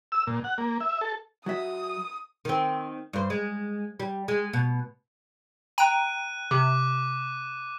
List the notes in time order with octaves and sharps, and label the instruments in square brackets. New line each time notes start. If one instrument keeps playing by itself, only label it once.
[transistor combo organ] E6
A#2
F#5
A#3
E5
A4
[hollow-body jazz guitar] F#3 F#4 E5 [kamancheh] D#6
[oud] D#3 C4
G2 C5
G#3
G3
G#3
B2
[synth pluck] G5 A#5 D7 [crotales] F#6 D#7
[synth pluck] C3 [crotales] D6